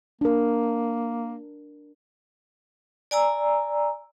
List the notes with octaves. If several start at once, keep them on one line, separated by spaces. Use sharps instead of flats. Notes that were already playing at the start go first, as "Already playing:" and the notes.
A#3 D4 A#4
D5 G#5 A#5 E6